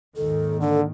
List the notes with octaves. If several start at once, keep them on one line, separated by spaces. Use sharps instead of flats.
G#1 D#2 D#3 A4
D3 A4